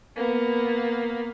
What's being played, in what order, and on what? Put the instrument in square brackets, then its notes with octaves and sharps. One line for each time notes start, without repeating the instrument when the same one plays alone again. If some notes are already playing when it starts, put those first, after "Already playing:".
[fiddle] A#3 B3